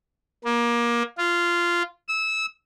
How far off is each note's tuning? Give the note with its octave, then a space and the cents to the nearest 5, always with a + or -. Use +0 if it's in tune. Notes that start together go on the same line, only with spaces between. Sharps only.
A#3 +25
F4 -10
E6 -20